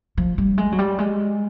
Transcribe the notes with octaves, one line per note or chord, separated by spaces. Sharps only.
F3
G3
G#3
F#3
G3
G#3